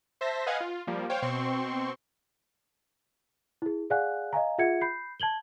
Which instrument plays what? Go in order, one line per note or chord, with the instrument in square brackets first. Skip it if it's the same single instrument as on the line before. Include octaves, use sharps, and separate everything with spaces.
[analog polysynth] C5 E5 A5 A#6 B6
B4 D#5 F5 F#5 G#5 G#6
F4
F3 G3 A#3
C5 C#5 F5 G5
B2 C4 C6 C#6
[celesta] E4 G#4
G#4 D5 F5 F#5 G#5 F#6
D#5 F5 G#5 A#5
F4 G#4 E5 F#5 G#6 C#7
B5 G6 C7
A5 G#6 F#7 G7